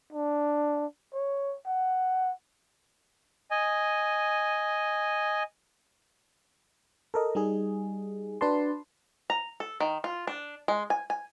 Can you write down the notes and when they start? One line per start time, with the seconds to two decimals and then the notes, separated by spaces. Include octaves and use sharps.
0.13 D4
1.13 C#5
1.66 F#5
3.51 D#5 G#5
7.14 A4 A#4 D#5
7.35 G3 D#4 G#4
8.41 D4 F#4 B4 D5 A5 C6
9.30 A#5
9.60 A4
9.80 D#3
10.04 F4
10.27 D4
10.68 G#3
10.90 G#5
11.10 G#5